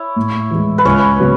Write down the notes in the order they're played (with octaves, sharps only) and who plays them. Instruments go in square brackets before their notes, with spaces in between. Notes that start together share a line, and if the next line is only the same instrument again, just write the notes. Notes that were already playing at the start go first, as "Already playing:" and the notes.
Already playing: [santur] E4 C#5
[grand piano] A2
E3 G#3
[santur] B4
[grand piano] C#2 [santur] C#4 C#5
[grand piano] C#3 F#3 B3